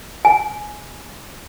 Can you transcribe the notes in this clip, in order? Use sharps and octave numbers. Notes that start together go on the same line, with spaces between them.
G#5